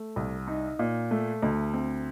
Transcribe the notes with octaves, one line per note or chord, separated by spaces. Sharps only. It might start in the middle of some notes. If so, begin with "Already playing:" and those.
Already playing: A3
C2
D#4
A#2
A3
D2
C4